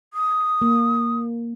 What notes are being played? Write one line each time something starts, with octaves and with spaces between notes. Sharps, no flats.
D#6
A#3